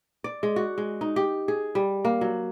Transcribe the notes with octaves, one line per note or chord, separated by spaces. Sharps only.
D5
G#3
F#4
G#3
D#4
G4
G#4
G3
A#3
F#3